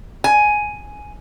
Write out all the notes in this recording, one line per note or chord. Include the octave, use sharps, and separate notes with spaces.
G#5